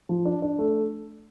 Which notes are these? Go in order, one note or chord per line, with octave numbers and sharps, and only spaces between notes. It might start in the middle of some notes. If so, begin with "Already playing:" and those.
F3
D4
D4
A3